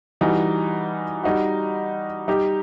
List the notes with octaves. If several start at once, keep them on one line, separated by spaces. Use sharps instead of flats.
E3 G3 D#4 F#4
G3 D#4 F#4
G3 D#4 G4